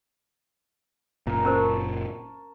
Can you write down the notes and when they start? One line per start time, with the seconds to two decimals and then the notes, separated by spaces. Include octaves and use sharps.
1.27 F#1 A#2 A#4 A#5
1.45 C#4 A#4 C5 A5 C#6